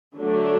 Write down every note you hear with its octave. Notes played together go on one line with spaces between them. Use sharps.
D3 F#3 A3 D4